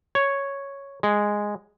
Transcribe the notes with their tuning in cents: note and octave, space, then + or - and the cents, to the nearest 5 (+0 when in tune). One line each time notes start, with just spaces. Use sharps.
C#5 +0
G#3 -5